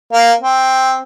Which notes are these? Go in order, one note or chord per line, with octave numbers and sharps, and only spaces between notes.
A#3
C4